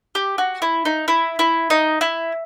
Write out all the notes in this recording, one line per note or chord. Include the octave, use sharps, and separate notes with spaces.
G4
F#4
E4
D#4
E4
E4
D#4
E4